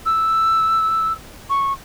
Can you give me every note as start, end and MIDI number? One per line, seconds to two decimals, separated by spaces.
0.06 1.12 88
1.50 1.73 85